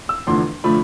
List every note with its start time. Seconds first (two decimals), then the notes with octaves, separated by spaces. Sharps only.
0.09 E6
0.27 E2 D3 F3 A3 C6
0.64 D3 F3 A3 B5